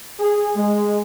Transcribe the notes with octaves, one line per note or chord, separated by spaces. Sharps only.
G#4
G#3